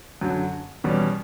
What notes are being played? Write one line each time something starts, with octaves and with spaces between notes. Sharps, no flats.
F#2 D3 F#3
E2 B2 G3 C#4